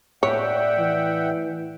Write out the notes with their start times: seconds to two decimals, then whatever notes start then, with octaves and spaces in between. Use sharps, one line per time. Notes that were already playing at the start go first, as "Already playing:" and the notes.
0.23 A2 C#5 D5 E5 F#5 G5
0.78 E3